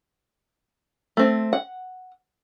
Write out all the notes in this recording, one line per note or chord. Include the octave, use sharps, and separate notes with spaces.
A3 C4
F#5